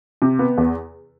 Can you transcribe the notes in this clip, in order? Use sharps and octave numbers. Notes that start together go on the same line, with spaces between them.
C3
B3
E2